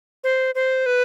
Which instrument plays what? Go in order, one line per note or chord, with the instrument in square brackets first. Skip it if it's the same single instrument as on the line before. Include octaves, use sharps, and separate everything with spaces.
[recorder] C5
C5
B4